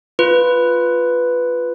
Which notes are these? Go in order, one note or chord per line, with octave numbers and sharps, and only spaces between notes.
F4 B4